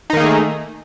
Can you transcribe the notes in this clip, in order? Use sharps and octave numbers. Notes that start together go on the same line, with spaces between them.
D#3 A3 A#3 D#4 G#4